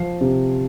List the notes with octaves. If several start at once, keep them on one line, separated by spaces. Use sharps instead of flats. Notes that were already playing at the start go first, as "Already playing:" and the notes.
Already playing: F3 C7
C3